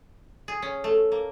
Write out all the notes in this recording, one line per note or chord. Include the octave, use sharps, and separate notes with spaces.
G#4
C#4
A3
A#3